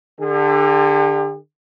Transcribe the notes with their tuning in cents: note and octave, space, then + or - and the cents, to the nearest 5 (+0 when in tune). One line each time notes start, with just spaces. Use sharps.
D3 +20 G4 +45